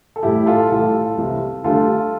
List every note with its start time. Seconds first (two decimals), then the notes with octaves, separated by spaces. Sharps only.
0.16 A4
0.23 A1 A2 G3 E4 G4
0.46 F4 A4
0.70 A1 A2 G3 F4 A4
1.17 C2 C3 E3
1.64 D2 D3 G3 F4 A4